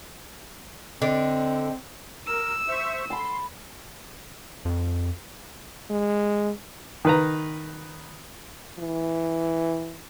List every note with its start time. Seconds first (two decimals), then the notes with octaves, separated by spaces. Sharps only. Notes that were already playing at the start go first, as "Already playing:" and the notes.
1.02 D3 C4 D5 D#5
2.27 A#4 E6
2.68 C5 E5 C#6
3.10 A5 B5 C6
4.65 F2
5.90 G#3
7.05 D#3 B4 A#5
8.79 E3